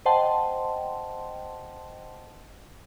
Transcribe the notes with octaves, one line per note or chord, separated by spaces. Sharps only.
C5 D#5 F#5 G5 A5 C6